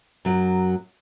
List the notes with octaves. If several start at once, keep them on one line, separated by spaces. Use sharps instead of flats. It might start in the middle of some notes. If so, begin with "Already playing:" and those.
F#2 F#3